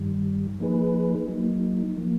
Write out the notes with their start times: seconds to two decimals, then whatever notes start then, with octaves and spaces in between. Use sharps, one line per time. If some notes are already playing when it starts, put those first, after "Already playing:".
Already playing: G2 D#3 G3
0.60 F3 A#3 D#4 G#4 B4
1.28 F#3 A#3 D#4
1.97 F3 A#3